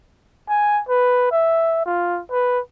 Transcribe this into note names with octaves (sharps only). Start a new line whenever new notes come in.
G#5
B4
E5
F4
B4